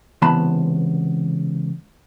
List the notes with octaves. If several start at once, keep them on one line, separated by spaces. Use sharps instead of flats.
C#2 C3 E3 B3 A5 B5